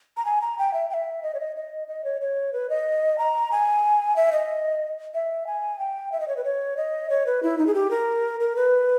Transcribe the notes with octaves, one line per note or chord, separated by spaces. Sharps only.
A#5
G#5
A#5
G5
E5
G5
E5
D#5
C#5
D#5
D#5
D#5
C#5
C#5
B4
D#5
A#5
G#5
E5
D#5
E5
G#5
G5
E5
D#5
C#5
B4
C#5
D#5
C#5
B4
E4
D#4
G#4
G4
A#4
A#4
B4